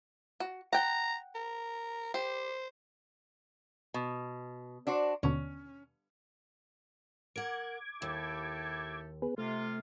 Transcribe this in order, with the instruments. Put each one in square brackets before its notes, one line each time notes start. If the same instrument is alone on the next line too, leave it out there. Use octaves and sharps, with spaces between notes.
[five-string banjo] F#4
[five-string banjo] F#5 G5 [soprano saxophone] A#5
[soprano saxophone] A#4
[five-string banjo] G4 [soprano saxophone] C5
[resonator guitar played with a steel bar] B2
D4 F#4 C5
[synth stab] D#2 B2 D3 [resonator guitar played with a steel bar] C#4
[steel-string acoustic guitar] A#4 F#5 [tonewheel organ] D6 G#6
[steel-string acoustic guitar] D#2 [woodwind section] E4 G4 A4
[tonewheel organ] B3 G#4 B4
[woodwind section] C3 F4 [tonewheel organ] A3